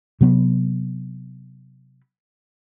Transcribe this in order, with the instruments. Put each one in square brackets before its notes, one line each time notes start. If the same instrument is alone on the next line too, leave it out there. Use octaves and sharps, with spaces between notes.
[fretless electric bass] C3 F#3 B3